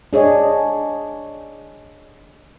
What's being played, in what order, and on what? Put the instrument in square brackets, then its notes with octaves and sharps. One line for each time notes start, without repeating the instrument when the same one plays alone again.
[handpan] D4 G#4 C#5 D#5